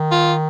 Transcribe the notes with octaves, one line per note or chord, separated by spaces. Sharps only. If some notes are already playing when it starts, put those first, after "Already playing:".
Already playing: D#3
F4